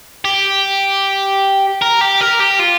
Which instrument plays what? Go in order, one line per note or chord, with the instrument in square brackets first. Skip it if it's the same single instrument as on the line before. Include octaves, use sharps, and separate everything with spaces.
[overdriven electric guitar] G4
A#4
G4
A#4
G4
F4